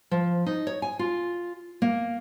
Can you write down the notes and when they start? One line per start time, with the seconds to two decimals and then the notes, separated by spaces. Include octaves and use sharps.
0.11 F3
0.46 D#4
0.67 C#5
0.82 G#5
0.99 F4
1.82 A#3